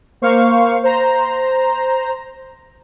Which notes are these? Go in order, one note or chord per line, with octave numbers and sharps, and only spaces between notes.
A#3 C5 F5 C#6
C5 A#5